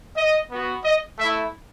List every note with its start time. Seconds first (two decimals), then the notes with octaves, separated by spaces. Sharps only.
0.17 D#5
0.51 B3 F#4
0.84 D#5
1.18 A3 E4 E5